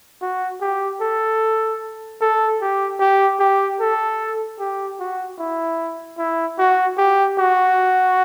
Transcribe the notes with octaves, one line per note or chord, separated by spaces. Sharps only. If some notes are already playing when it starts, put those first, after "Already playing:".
F#4
G4
A4
A4
G4
G4
G4
A4
G4
F#4
E4
E4
F#4
G4
F#4